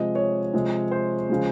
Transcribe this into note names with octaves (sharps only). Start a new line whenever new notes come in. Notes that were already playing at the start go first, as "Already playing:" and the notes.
Already playing: C3 F3 G#3 D#5
C#5
C3 F3 G#3
C5
C#3 F3 G#3